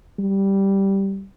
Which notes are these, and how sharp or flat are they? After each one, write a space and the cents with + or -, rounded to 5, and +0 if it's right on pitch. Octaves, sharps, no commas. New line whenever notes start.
G3 -5